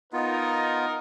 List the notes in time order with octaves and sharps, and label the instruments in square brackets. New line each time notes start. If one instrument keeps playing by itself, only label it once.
[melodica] B3 F4 [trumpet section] D#4 A#4